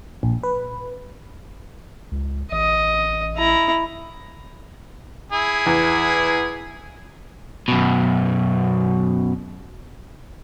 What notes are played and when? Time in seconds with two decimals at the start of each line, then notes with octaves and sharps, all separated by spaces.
0.23 A#1
0.43 B4
2.11 C#2
2.51 A1 D#5
3.38 E4 A#5
5.32 E4 G#4
5.66 E2
7.68 F#2 B2